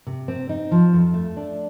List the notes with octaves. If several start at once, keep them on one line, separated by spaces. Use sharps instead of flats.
C3
C4
D#4
F3
F2
A3
D4